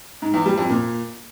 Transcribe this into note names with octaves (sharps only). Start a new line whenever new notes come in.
G#2
E2
G3
F2
A#2